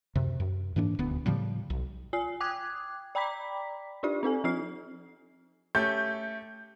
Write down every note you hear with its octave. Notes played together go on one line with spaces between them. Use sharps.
F#2 C3
F#2
G#2 E3 A#3 D4
D#1 D2 B3
A2 C#3 F3 G3
B1
F4 G#5 C7
G5 D6 D#6 F#6 G#6
D5 G5 A#5 B5 D6 B6
D4 D#4 F4 G4 D5
C4 D#4 A4 G#5
F3 C4 D#4 F4 F6 C7
A3 C#4 G4 G6